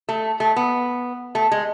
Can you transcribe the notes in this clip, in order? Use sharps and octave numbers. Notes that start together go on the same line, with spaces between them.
A3
A3
B3
A3
G#3